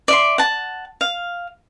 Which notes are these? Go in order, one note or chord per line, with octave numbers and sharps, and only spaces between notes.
D5 E5 C6
F#5 A5
F5